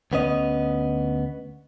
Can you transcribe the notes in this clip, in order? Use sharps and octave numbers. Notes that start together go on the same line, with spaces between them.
D2 B3 C#4 D#5